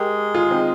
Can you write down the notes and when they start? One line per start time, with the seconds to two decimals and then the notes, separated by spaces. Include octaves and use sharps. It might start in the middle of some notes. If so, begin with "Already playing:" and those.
Already playing: G#3 G4 A#4
0.35 F4 G#4
0.51 C4 D#4